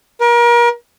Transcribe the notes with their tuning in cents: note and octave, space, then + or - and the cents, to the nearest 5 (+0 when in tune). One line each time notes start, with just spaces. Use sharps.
A#4 +35